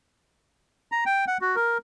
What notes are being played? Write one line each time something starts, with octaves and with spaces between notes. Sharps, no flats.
A#5
G5
F#5
F#4
A#4